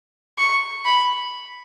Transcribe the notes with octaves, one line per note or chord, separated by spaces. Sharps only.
C#6
B5